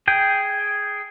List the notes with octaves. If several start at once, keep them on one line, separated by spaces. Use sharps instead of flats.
G#4 G5